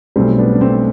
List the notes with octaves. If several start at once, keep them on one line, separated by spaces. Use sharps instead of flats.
B1 B2 G3 A3 C4
B3 D4
D4
A3 C4